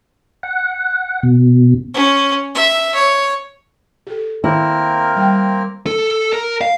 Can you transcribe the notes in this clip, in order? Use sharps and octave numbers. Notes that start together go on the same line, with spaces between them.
F#5
B2
C#4
E5
C#5
G4 A4
D#3 A#3 C4 E4 A#4
G3 G5
A4
A#4
F5